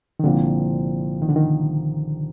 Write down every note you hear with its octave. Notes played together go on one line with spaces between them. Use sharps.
D#3
C2 A#2 D3 F3 C4
D#3
D3
D#3